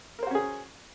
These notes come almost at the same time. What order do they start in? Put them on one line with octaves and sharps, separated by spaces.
A#4 C5 F#4 C#4 G#4